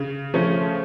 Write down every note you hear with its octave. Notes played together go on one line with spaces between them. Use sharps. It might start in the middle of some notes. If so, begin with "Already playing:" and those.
Already playing: C#3
F3 A3 C#4